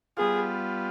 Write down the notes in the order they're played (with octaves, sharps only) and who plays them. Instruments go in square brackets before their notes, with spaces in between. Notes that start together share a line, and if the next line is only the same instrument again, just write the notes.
[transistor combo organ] G3 B3 F4 [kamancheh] G#4